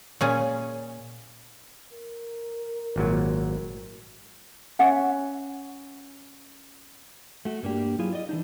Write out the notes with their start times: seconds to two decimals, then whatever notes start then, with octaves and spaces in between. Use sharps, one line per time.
0.21 A#2 C#4 G#4
1.93 A#4
2.96 G#1 A#2 F#3
4.79 C#4 E5 F#5
7.45 A3 F#4
7.63 G2 G3 A#3 D4 G4
7.99 F#3 E4 F4 G#4
8.13 D5 D#5
8.29 E3 D4 D#4